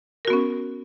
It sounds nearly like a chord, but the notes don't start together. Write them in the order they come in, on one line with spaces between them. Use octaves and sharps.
A#4 F#4 B3 C#4